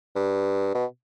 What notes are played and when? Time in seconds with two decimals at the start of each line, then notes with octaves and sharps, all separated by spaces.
0.15 G2
0.74 B2